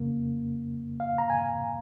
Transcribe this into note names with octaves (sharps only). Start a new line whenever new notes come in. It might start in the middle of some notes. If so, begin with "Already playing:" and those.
Already playing: F2 C#3 A#3
F5
A#5
G#5